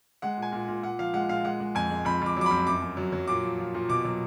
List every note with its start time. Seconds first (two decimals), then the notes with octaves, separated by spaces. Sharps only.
0.22 G#3 F#5
0.37 A#2
0.42 G#5
0.52 A#2
0.68 A#2
0.83 A#2 F#5
0.99 F3 F5
1.13 G#3 F#5
1.29 A#2 F5
1.45 G#3 F#5
1.60 G#3
1.75 F2 G#5
1.90 G#3
2.05 F2 B5
2.22 F2 D6
2.37 F#3 D6
2.46 B5
2.51 F2
2.67 F#2 D6
2.82 F#2
2.97 F#3
3.12 F#3
3.27 A#2 D6
3.43 F3
3.58 F3
3.74 A#2
3.89 B2 D6
4.04 F#3